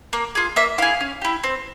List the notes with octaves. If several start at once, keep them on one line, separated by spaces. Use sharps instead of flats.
A#3
F4 G#4
A#3 E5
E4 G#4 F5
C#4
E4 G4
C4